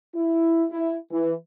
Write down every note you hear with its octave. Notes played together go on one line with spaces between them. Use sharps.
E4
E4
E3